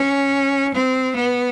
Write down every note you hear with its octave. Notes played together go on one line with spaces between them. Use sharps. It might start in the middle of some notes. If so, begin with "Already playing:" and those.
Already playing: C#4
C4
B3